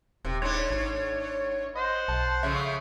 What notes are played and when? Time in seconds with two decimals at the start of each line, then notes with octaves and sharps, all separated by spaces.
0.25 D#1 C3
0.42 G#2 D4 C#5
0.71 G#1
1.75 C5 D#5 F#5
2.08 B1 A5
2.43 C#3 F3 A3 E5